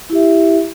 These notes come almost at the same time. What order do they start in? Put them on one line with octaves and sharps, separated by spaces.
E4 G4 E5